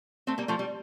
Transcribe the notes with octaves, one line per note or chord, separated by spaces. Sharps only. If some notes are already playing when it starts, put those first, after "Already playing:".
A3 C4
G3 A#3
F3 A3
G3